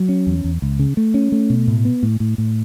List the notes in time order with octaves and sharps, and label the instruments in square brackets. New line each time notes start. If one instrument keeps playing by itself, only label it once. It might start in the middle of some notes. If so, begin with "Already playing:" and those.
Already playing: [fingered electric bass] F#3
C#4
E2
E2
C#2
C#3
A3
C#4
A3
B2
A2
B3
A2
A2
A2